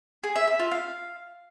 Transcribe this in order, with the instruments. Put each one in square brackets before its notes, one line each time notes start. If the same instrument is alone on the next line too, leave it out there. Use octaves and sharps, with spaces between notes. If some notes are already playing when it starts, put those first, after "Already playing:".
[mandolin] G#4
E5
E5
F4
F5